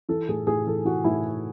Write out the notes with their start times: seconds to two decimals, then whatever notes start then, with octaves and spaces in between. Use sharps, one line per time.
0.09 E3 A4
0.29 A2 G#4
0.47 A2 G#4
0.66 E3 A4
0.85 E3 F#4
1.04 A2 E4